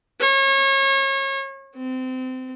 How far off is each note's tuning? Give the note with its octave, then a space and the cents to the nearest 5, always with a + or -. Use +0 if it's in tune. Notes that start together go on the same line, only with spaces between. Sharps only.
C#5 -30
C4 -25